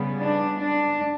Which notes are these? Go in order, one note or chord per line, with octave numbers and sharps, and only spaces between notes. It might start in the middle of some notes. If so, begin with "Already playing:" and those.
Already playing: C#3 G3 B3
D4
D4